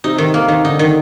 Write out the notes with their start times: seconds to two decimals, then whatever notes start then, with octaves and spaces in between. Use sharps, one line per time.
0.04 C3 D#4
0.18 D#3
0.34 A#3
0.48 D#3
0.65 D3 D#4
0.79 D#3